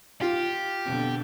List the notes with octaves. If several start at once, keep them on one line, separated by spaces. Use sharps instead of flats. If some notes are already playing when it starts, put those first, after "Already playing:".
F4 G4
F2 B2 D3